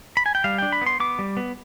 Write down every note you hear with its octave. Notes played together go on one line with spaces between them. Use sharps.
B5
G#5
G5
G3 F5
D4 G5
B5
B3 C6
B3 D6
G3
B3